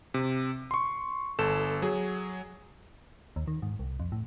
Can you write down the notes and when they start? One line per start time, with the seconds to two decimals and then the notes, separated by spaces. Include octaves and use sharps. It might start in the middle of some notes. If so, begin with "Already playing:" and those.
0.14 C3
0.71 C6 C#6
1.39 G1 A4 E7
1.82 F#3 G#4
3.36 D#2
3.48 D#3
3.62 G#2
3.79 C2
4.00 F2
4.12 A2